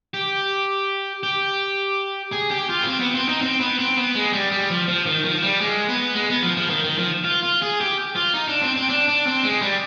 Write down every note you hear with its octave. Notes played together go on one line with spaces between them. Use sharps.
G4
G4
G#4
G4
F4
B3
C4
B3
C4
D#4
C4
B3
C4
B3
G#3
G3
G3
F3
F3
D#3
F3
G3
G#3
B3
G#3
B3
F3
F3
D#3
D#3
F3
F4
F4
G#4
G4
F4
D#4
D4
C4
C4
D4
D4
C4
G#3
G3